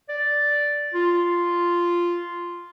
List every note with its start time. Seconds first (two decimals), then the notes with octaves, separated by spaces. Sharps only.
0.09 D5
0.94 F4